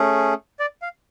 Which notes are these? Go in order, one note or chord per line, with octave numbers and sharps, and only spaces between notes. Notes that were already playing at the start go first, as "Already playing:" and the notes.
Already playing: A3 C#4 G#4
D5
F5